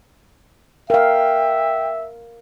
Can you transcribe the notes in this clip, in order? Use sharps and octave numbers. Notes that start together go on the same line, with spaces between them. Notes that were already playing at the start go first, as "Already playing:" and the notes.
A#4 E5 F5 G5